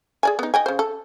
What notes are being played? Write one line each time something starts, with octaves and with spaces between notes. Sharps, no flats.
G#4 D5 G#5
B3 D#4
D#5 G5 G#5
C#3 C5
A4